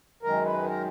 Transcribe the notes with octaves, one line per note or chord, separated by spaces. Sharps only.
F#2 D#3 G#3 A#4
B4
G#4
A#4